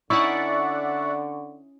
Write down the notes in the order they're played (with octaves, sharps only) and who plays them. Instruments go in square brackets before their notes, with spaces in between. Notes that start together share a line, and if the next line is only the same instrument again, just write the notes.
[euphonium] D3 [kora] C#4 D#4 E4 [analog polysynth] D5 E5 F#5 [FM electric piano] C#6